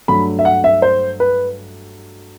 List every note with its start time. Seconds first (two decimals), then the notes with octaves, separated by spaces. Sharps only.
0.08 G2 F#3 A3 B5
0.39 E5
0.45 F#5
0.64 E5
0.82 C5
1.20 B4